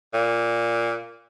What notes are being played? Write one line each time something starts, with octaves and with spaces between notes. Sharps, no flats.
A#2